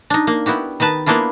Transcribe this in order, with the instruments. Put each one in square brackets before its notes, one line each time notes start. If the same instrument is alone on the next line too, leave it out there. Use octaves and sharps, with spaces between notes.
[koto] D4 D#4
A#3
B3 E4 F#4 G4
D#3 D#4 B4 A5
A#3 B3 D4 E4 F4